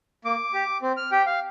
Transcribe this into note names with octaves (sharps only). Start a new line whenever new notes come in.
A#3 D6
G4
C4
F6
G4 G5
F5